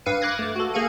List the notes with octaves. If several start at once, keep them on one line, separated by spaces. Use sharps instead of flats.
G2 B4 F5 C#7 D#7
D6 F#6 G#6 A#6 C7
A3 D6
F#4 A4
A#3 G#4 F5 C#7 D#7